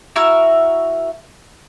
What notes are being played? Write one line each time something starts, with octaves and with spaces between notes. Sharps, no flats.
E4 F#4 A#4 E5